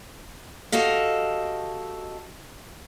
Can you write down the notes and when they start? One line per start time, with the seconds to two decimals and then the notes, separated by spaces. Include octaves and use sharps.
0.72 F#4 G4 A4 D#5 F5